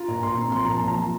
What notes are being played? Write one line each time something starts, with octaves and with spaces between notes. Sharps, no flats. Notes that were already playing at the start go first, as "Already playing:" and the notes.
Already playing: F4 A#5
A#2
A#2 C6
C4
F3 C6
A#2 A#5
A5
A#2
A#5
F3